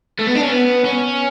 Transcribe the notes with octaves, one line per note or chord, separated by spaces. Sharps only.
A3
B3
D4
C#4
B3
C#4